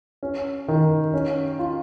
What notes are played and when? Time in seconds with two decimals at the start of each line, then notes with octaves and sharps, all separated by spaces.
0.23 C#4
0.68 D#3
1.14 C#4
1.59 F4